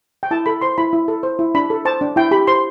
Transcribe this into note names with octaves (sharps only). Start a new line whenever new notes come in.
G5
E4 A5
A4 B5
C5 C6
E4 B5
E4
A4
C5
E4
D4 B5
A4
C5 A5
D4
E4 G5
G4 B5
C5 C6